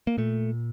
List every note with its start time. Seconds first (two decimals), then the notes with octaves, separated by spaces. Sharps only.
0.07 A#3
0.18 A#2 A3